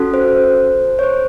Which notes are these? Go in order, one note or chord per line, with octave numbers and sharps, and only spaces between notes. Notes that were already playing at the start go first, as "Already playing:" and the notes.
Already playing: C#4 F#4 A4
C5
C#5
C5